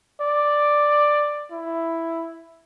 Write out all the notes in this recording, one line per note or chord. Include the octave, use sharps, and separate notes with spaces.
D5
E4